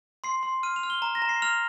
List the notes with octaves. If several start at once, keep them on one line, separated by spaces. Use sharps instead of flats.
C6 C7
C6
F6 D#7
F7
F6
G7
A#5
A#6
A#5
C7
F6 F7